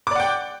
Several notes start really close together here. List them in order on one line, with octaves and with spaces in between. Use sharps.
D6 D5 F#5 G5